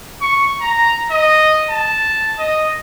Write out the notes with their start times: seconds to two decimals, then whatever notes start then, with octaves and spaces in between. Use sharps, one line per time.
0.21 C#6
0.61 A#5
1.11 D#5
1.70 A5
2.38 D#5